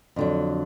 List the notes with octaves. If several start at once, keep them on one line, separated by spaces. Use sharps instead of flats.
F2 D3 F#3